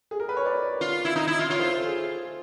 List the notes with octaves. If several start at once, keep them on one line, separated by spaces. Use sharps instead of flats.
G#4
A#4
B4
C#5
D5
F4
E4
D#4
E4
F4
F4 C#5
C5
A4
G#4